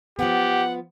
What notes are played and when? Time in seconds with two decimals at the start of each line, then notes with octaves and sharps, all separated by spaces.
0.19 F3 B3 G4 F#5